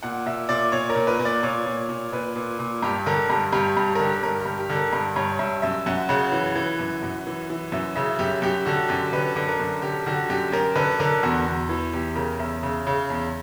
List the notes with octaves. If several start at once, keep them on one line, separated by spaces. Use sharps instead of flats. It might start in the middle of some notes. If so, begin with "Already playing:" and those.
A#2 F#5
A#2 E5
A#2 D5
A#2 C#5
A#4
A#2
B4
A#2
D5
A#2 C#5
A#2
A#2
A#2 B4
A#2
A#2
G2 G4
D3 A#4
G2
G2 G4
G2
G4
A#4
D3 G4
G2 A#4
G4
G2
G4
D3
A#4
G2
G2 C#5
G2 E5
F#2 E5
F#2 F#5
C#3 F#5
E3
E3
F#2
F#2
E3
E3
F#2 E5
C#3 E5
F#2 G4
F#2 G4
D3 F#4
F#2 G4
D3 B4
D3
A#4
F#2
D3 G4
D3 F#4
F#2 G4
F#2 A#4
D3 B4
D3 A#4
E2 F#4
E2
E3
E2 G4
C#3 A#4
E2 E5
C#3
C#3
E2